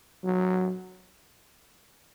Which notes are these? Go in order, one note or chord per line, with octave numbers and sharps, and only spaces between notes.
F#3